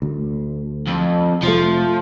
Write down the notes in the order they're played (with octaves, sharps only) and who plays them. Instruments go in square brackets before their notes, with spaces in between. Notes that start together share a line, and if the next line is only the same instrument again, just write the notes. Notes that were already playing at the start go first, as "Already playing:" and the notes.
[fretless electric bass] D2
[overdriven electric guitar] F2
[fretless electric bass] F1 A3 [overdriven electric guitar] F3